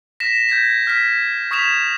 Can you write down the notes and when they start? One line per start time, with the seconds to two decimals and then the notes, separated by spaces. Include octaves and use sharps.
0.20 A#6 B6 E7
0.49 G6 G#6 A#6 B6
0.87 F6 B6
1.51 C#6 D#6 G#6 B6 E7 F7